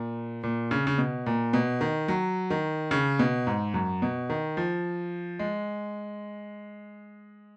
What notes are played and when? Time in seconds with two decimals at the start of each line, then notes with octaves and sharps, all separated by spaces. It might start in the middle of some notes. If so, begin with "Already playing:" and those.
Already playing: A#2
0.44 A#2
0.71 C#3
0.87 C#3
0.98 B2
1.26 A#2
1.53 B2
1.81 D#3
2.08 F#3
2.50 D#3
2.91 C#3
3.19 B2
3.47 G#2
3.74 F#2
4.02 B2
4.30 D#3
4.57 F3
5.39 G#3